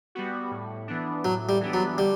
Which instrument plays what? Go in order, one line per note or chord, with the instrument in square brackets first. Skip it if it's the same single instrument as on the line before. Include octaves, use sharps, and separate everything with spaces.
[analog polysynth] G3 B3 F#4
A2
E3 B3 D4
[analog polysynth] A2 [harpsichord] F#3
[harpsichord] G3
[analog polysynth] E3 B3 D4
[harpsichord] F#3
[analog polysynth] D3 [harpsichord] G3